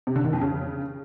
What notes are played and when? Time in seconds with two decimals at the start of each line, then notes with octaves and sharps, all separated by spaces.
0.07 C3
0.16 D3
0.24 D#3
0.33 F2
0.42 C#3